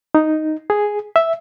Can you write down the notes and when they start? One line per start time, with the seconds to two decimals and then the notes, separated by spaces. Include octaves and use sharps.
0.15 D#4
0.70 G#4
1.16 E5